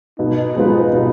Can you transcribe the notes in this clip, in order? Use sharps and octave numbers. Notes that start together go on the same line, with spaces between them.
B2 D#4
G#3 B3 F4 B4
B2